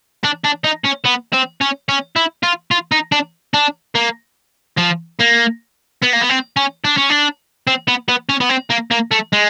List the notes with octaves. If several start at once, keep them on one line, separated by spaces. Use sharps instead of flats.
D4
D4
D#4
C#4
B3
C4
C#4
C#4
E4
F4
F4
D#4
D4
D4
A#3
F3
A#3
B3
A#3
B3
C4
C#4
D4
C#4
D4
C4
B3
B3
C#4
B3
C4
A#3
A#3
A3
G#3